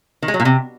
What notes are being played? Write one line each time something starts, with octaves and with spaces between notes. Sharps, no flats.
D#3
G#3
F#3
A#2
C3